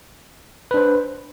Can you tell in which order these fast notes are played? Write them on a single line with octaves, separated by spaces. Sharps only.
B4 D4 C5